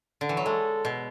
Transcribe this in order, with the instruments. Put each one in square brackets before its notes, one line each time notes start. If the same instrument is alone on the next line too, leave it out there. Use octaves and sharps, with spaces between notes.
[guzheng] D3
E3
F#3
[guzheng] G#3 [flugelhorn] A4
[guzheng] B2